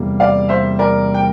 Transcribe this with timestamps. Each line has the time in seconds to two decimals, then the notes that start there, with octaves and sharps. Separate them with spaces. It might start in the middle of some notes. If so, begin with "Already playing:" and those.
Already playing: E2 C3 G3 A#3
0.20 D5 F5
0.49 C5 E5
0.79 A#4 D5
1.14 G5